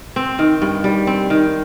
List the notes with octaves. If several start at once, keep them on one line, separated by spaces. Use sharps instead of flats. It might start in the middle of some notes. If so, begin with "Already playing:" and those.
C4
D#3
G2
G3
C4
D#3